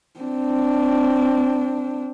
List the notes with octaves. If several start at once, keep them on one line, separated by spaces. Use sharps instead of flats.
C4 D4